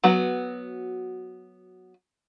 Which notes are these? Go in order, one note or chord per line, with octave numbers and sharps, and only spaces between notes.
F#3 B3 F#4